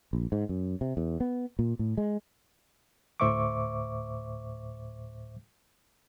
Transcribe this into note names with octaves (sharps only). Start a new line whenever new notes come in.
A#1
G#2
F#2
C3
E2
B3
A#2
A2
G#3
D2 A2 C5 E5 C#6 D6